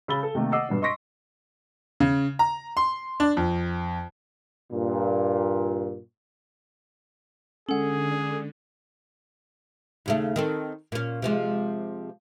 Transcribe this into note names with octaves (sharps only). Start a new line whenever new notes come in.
C#3 B5 E6 A6 G7
A4
C3 D#3 A3 A#3
D#5 F#5 D6 E6 C7
G2 B2 D4
D#5 C6 C#6 A#6 B6 D7
C#3
A#5
C6
D4
F2
G2 A#2
D3 G#3 C#4 G#4 A4 F#5
D#2 C#3 A3
D#3 C4 A4
A#2 C#4
C3 F3 G#3